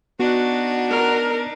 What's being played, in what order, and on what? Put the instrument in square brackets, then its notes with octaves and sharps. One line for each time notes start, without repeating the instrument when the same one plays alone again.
[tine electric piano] B3 [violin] D4 D#4 [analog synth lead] F#4
[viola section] A#4